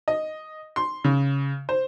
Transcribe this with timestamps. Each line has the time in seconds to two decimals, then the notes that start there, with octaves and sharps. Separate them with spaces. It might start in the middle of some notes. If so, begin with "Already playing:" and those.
0.08 D#5
0.76 C6
1.04 C#3
1.69 C5